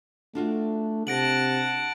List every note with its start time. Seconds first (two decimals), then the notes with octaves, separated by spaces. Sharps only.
0.35 A3 D4 F4 F#4
1.07 C3 F#5 A5 A#6 D7 F#7